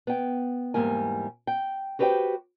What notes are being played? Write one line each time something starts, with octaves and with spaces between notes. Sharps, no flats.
B3 G5
E2 G#2 G3 A#3 G#5
G5
F#4 G4 B4 C5 D#5 G5